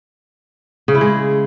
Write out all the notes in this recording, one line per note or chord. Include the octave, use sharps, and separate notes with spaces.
C#3
E4
G#3